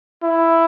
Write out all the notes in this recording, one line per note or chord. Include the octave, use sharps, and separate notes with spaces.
E4